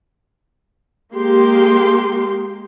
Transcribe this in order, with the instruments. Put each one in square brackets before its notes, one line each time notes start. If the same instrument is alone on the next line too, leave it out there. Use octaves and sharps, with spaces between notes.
[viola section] G#3 A#3 G4 C6